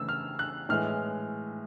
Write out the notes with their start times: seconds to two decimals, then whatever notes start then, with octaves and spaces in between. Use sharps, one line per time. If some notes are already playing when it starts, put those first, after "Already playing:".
Already playing: C#3 E3 A3 E6
0.09 F6
0.39 F#6
0.69 A2 E3 G#3 F6